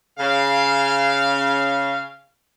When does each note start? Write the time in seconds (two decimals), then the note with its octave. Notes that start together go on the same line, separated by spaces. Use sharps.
0.19 C#3 F5